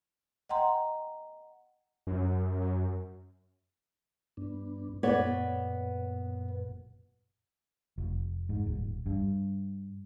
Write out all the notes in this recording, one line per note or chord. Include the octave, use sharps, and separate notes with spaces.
D#5 F#5 G5 A#5 C6
F#2
G2 B3 D4
F#2 A#2 B3 C#5 D5
F1
G#2
D#1
G2